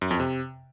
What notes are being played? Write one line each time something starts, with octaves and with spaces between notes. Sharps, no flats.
F#2
F2
C3